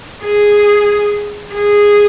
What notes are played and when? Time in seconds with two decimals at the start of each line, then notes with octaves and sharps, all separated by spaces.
0.24 G#4
1.54 G#4